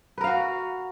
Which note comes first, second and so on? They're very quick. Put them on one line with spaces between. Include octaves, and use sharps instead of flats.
B4 A#4 F5 F#4